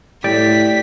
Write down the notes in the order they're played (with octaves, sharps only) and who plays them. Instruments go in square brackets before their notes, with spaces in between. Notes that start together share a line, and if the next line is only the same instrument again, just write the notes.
[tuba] A2 [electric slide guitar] G4 D5 [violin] B6